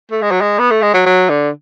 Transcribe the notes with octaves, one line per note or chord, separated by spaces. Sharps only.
A3
G#3
F#3
G#3
B3
A3
G#3
F#3
F#3
D3